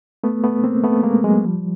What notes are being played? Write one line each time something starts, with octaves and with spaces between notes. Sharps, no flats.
A3 B3
A3 B3
A#3 C4
A3 B3
G#3 A#3
F#3 G#3
F3 G3